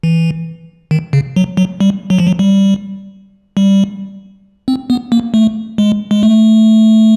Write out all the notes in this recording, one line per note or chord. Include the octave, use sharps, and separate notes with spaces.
E3
D#3
C#3
F#3
F#3
G3
F#3
F3
F#3
G3
G3
C4
B3
A#3
A3
G#3
G#3
A3